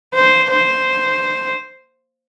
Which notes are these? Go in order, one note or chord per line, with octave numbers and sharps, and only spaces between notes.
C5
C5